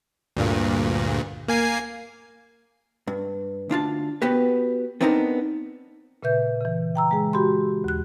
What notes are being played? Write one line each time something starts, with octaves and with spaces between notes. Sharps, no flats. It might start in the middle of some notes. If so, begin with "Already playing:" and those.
D2 G2 A#2
A#3 G#5 C7
G2
D2 D4 F4 A5
B3 F#4 G4 B4
B3 C4 D4 D#4 A4 A#4
A#2 C#3 B4 E5 G6
C#3 E3
G5 A#5 E6
G#3 G#4
F#4 G4 B5 C6
D#2 F#6